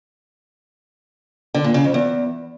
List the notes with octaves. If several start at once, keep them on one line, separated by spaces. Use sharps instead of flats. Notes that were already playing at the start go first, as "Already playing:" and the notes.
D3
A#2
C#3
F2
E2